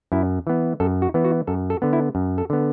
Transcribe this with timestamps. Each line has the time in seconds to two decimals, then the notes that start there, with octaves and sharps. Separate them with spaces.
0.12 F#2 E4
0.47 E3 B3
0.80 F#2 A4
1.02 F#4
1.14 E3 B3
1.24 F#4
1.47 F#2 A4
1.70 A4
1.82 D3 B3
1.93 E4
2.15 F#2
2.38 A4
2.50 D3 B3